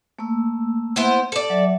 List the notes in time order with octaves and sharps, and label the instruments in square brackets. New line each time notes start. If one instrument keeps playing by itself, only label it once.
[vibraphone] A3 A#3 E6
[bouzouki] B3 E4 C5
A4 D5
[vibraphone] F#3 E5